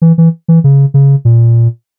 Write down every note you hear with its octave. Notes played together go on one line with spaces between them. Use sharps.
E3
E3
E3
C#3
C#3
A#2